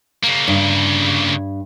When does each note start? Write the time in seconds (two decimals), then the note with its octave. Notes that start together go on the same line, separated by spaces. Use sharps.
0.23 C#3 A#3
0.48 G2